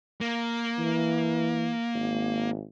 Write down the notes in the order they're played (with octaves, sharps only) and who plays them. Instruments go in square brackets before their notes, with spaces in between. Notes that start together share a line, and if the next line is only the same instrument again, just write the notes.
[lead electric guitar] A#3
[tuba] E3
G#1